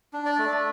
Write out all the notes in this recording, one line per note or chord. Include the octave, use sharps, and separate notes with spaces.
D4
D5
A3